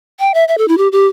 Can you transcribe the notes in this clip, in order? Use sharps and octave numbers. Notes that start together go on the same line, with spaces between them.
G5
E5
E5
A4
E4
G4
G4